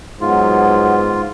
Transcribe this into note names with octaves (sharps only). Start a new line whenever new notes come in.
G#2 F#3 B3 F4